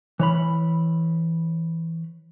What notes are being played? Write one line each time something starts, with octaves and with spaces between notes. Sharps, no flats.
E3 C#5 B5